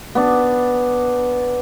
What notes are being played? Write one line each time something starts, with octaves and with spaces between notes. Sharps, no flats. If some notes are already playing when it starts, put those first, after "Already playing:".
B3 D4